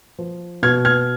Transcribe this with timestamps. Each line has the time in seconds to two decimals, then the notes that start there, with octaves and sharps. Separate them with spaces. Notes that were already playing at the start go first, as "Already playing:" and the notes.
0.19 F3
0.63 B2 F6 G#6
0.85 F6 G#6